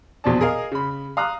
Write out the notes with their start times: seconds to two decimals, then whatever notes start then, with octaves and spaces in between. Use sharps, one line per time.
0.24 A#1 E2 B2 F3 D5 A5
0.41 G#4 A#4 D#5 F5
0.72 C#3 B5
1.17 F5 A#5 D#6 F#6